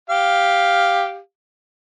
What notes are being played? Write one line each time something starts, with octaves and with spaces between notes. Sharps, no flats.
G4 F5